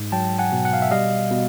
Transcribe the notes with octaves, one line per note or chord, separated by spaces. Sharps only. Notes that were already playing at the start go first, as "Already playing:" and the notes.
Already playing: G#2
F#3 G5 A5
F#5 G#5
B2
F#5
F5
E5
G3 D#5 F5
B2